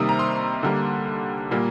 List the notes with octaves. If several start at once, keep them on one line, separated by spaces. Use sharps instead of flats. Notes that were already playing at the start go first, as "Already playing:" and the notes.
Already playing: C3 D#3 G3 A#3 D#6
A#5
C6
D3 G3 A#3
A#2 G3 A#3